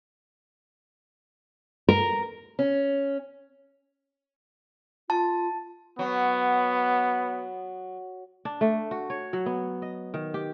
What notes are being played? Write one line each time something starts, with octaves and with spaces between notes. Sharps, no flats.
A#4
C#4
F4 A5
F#3 B3
D4
A3
F#4
C#5
F#3
B3
D#5
D#3
G4